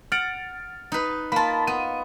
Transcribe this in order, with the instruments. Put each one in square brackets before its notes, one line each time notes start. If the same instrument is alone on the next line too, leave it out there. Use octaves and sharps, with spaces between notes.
[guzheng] F#5 [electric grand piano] F6 A6 D7
[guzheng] D#4 B4
[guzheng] A#3 F4 [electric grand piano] A5 B5
[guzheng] B3 [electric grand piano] D#7